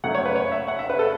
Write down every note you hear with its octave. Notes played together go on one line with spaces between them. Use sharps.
F#2 F#3 A3 C#4 F#5
C#5
B4
C#5
E5
F#5
E5
B4
A4